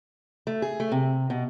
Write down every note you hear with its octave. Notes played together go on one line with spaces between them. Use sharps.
A3
G#4
A3
C3
B2